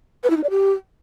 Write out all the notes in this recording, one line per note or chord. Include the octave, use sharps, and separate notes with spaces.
B4
E4
D#4
D5
G4